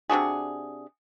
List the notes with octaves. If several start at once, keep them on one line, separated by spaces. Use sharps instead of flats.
C3 D4 F#4 G#4